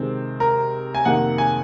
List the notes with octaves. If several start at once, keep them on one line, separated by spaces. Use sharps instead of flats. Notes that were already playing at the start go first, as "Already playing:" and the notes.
Already playing: C3 D#3 G#3 C4
A#4
G#5
F2 C3 D#3 A#3 F#5
G#5